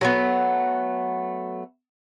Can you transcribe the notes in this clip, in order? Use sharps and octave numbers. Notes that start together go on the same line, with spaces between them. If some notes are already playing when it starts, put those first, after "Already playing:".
F#3 A3 B3